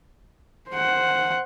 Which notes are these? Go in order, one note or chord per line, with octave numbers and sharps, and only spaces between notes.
C5 F#5